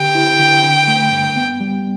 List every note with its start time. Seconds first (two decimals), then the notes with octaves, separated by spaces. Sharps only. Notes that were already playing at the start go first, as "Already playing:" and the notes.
Already playing: D3 G4 G5
0.15 E4
0.39 D3
0.63 D3
0.88 A3
1.11 G2
1.36 B3
1.60 G3